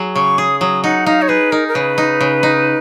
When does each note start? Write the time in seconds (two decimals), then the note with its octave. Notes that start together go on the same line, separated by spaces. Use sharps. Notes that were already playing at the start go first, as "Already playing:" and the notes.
Already playing: F#3 G#4
0.16 C#3 C#6
0.38 G#4 D#6
0.60 F#3 D#6
0.84 D#4 F#5
1.06 D#4 F5
1.22 C#5
1.29 G#4 B4
1.52 D#4 A#4
1.68 A#4
1.75 C#3 B4
1.98 D#4
2.21 C#3
2.43 D#4